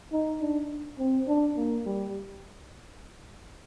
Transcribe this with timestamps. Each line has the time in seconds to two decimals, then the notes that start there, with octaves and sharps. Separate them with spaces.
0.12 D#4
0.41 D4
0.99 C4
1.28 D4
1.57 A#3
1.86 G3